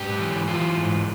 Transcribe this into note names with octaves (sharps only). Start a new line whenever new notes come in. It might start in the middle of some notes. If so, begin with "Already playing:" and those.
Already playing: G#2 G4
E3
E3 F4
G#2